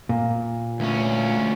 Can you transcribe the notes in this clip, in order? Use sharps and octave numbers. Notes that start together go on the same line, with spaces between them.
A#2
D2 C#4